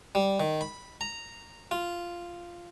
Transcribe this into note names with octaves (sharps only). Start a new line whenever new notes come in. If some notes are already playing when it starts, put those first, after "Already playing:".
G3
D#3
B5
A#5
F4